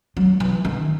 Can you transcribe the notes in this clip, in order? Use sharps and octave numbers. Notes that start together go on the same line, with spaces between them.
F#3
E3
D#3